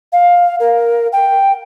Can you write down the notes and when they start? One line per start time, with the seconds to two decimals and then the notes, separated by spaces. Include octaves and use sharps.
0.13 F5
0.60 A#4
1.13 G5